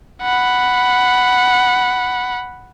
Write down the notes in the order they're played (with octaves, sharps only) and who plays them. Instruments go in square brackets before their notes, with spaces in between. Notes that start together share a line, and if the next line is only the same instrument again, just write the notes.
[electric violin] F#5 B5